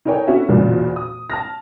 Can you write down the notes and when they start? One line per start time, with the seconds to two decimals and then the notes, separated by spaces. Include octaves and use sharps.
0.05 D#4 A4 A#4 C#5 G5 G#5
0.27 B3 C#4 D4 F#4 A4 E5
0.49 F#1 B1 E2 A#2 C#3
0.96 D#6
1.30 A5 F6 A#6